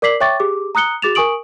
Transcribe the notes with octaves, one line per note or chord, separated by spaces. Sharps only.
A#4 D5 D6 B6 C7 F#7
C#5 E5 G5 C#6 D6 A6
G4 G#4 D6
A#5 D#6 F#6 C#7 G7
F#4 G#4 D6 A6 E7 F7
A#4 G#5 C#6 D#6 D7 F#7